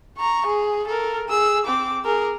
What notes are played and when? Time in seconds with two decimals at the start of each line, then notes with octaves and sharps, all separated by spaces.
0.18 A#5 C#6
0.47 G#4
0.87 A4 A#4
1.28 G#4 E6
1.66 C4 D6
2.05 G#4 A#4